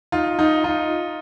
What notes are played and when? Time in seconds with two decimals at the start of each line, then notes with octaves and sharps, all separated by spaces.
0.12 D#4 F4
0.39 D#4 F4
0.64 D#4 F4